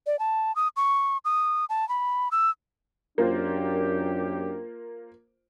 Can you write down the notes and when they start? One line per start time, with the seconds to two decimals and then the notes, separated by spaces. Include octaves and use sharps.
0.07 D5
0.19 A5
0.56 D#6
0.76 C#6
1.25 D#6
1.69 A5
1.89 B5
2.31 E6
3.18 F#2 A#3 D4 F4 G4 C5